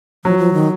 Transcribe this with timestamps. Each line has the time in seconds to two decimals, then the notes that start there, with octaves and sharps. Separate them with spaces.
0.24 F3 F#3
0.38 F3
0.53 D#3